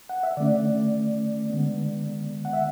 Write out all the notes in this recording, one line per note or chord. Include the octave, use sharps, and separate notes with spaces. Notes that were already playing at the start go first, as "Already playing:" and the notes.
F#5
E5
D3 A3 C#4 D5
D3 G#3 B3
F#5
E5